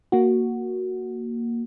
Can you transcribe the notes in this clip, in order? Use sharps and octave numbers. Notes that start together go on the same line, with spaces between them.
A#3 F#4